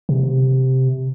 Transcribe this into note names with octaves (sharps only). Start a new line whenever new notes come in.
C3